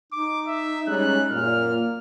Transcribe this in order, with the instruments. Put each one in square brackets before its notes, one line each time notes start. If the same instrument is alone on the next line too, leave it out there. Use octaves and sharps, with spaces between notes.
[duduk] D#4 [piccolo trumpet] D6
[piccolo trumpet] E5
[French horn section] G3 G#3 C#4 [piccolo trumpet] F#6
[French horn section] F#2 A#2 [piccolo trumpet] F6
[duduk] A#3